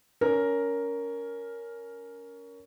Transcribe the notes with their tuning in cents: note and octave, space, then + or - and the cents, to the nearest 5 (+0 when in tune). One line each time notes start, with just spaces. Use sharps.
C#4 +20 A#4 +0